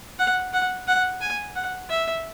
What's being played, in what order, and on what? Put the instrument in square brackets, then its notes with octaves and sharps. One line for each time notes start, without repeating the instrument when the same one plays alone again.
[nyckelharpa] F#5
F#5
F#5
G#5
F#5
E5